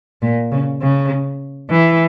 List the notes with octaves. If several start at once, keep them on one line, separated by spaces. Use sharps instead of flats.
A#2
C#3
C#3
E3